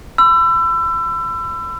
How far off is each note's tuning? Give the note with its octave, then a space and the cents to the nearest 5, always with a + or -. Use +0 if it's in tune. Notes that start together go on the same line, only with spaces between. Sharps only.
B5 +40 E6 +30